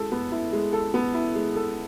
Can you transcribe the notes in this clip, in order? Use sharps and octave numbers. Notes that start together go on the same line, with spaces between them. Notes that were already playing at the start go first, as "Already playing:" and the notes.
Already playing: G#3 E4 A4
B3
E4
G#3
A4
B3
E4
G#3
A4